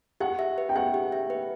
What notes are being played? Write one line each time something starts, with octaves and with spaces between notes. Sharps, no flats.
G4 F#5
E5
B4
G5
G4 F#5
G4
E5
B4